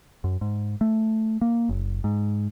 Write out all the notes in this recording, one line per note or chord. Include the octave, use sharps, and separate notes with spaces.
F#2
G#2
A3
A#3
F#1
G#2